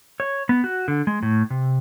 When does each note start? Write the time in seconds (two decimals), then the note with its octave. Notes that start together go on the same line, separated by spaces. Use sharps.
0.20 C#5
0.49 B3
0.64 F#4
0.88 D3
1.07 G#3
1.23 A2
1.50 C3